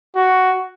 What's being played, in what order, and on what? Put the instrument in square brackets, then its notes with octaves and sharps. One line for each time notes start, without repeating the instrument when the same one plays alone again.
[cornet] F#4